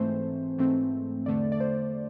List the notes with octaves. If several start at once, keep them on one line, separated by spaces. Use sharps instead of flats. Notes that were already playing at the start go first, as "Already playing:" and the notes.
Already playing: G#2 E3 A3 C4 C5
G#2 E3 A3 C4
E2 D3 A3 D5
D5
C5